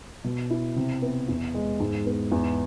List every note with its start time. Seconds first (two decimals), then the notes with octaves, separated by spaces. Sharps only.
0.24 B2
0.50 E4
0.76 C3
1.02 B3
1.29 E2
1.55 G#3
1.80 G#2
2.06 B3
2.32 E2